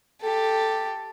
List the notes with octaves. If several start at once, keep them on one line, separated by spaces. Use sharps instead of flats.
G4 A4